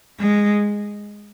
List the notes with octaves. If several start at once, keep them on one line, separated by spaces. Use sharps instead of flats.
G#3